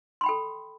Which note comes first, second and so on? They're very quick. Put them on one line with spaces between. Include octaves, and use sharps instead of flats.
C6 B5 G5 A4